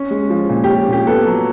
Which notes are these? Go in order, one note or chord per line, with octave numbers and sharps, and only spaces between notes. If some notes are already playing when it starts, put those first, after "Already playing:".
Already playing: C#4
G#3
F3
A#2
C#4 G4
A#2 G4
B3 A4
F#3